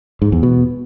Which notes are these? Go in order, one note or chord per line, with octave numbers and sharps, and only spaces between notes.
G#2
E2
B2